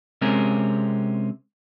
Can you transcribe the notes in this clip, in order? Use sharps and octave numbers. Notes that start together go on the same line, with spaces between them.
C3 G#3 C4 C#4 A#4